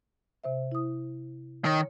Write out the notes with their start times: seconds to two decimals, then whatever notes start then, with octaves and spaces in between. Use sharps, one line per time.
0.44 C3 C5 E5
0.72 E4 D#6
1.65 D#3 C#5